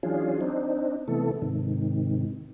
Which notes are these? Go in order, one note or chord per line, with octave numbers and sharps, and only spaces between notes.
E3 F#3 C#4 D4 F4 G#4
C4 D4 D#4
C3 E3 A3 B3 A4
G#2 C3 D#3